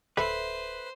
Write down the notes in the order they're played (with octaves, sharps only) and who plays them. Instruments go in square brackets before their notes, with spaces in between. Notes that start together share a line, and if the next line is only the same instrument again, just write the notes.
[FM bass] D1 [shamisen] A4 E5 B5 [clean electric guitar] B4 [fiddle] C5